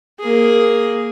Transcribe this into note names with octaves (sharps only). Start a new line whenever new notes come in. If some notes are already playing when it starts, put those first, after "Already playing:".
A#3 G#4